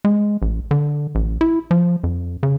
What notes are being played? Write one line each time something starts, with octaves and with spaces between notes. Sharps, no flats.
G#3
A1
D3
A1
E4
F3
F2
C#3